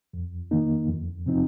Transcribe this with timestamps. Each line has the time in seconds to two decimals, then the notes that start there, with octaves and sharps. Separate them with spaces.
0.13 F2
0.51 D#3 A#3 D#4
0.89 F2
1.26 C3 F3 C4 D#4